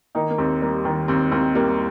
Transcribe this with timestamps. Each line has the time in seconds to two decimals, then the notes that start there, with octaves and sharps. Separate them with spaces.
0.15 D#3 A#3 D#4
0.30 A#3
0.38 D#2 C4
0.61 G3 A#3
0.85 D#3
1.08 D#2 C4
1.32 D#2 C4
1.55 G3 A#3